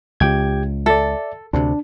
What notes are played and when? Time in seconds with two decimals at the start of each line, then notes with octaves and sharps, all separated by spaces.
0.20 C#2 G4 G5 G#6
0.86 A4 D5 E5
1.53 D2 C3 D4